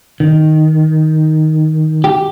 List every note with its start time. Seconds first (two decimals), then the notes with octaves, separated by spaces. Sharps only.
0.20 D#3
2.04 G4